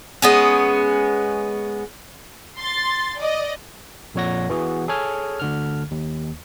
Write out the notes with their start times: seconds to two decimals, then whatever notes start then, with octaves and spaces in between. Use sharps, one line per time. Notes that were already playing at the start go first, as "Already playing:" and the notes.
0.22 G#3 B3 C#4
2.58 C6 A6
3.19 D5 D#5
4.14 A#1 F2 A#2 C#5 F#5 A#6
4.49 E3 B3 F#4 G#4
4.88 G#4 A4 C#5 G#5 F6
5.40 D2 D3 F6
5.91 D#2